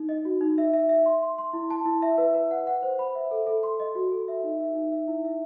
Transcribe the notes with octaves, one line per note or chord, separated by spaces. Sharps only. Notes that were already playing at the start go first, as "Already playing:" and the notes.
Already playing: D#4
D#5
F#4
D#4
E5
E5
E5
C6
C6
C6
E4
A5
E4
E5
B4
B4
F#5
F#5
C5
B5
E5
A4
A4
C6
D#5
F#4
A4
E5
D#4
E5
D#4
E5
E4
E5